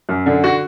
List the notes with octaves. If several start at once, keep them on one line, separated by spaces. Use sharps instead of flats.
F#2
D3
F#4